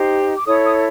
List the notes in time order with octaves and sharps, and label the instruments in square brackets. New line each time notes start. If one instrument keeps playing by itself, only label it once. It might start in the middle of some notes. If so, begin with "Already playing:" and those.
Already playing: [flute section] D#4 G4 C5
D6
E4 A4 C#5 D#6
D#6